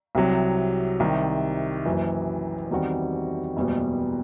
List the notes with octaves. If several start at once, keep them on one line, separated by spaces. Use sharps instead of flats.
C2 C3 F#3
C2 C3 D#3
F#1 F#2 E3
E2 D#3 G3 C4 F#4
F#1 E2 B2 G3